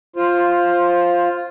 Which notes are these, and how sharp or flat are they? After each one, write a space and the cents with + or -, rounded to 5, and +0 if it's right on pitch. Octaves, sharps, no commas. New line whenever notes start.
F4 +0 C5 +10